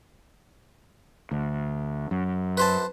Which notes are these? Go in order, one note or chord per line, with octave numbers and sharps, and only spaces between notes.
D2
F#2
B4 C5 A5